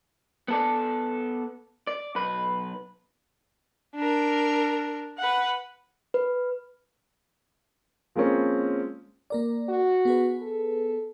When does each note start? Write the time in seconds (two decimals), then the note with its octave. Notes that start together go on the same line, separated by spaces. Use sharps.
0.48 B3 A4 D5
1.87 D5
2.15 B1 B4
3.96 D4 A#4
5.18 B4 F#5
6.14 B4
8.15 F3 G#3 A#3 C4 C#4
9.30 A#3 A#4 D5
9.69 F#4
10.05 B3 G#4 B4
10.42 A4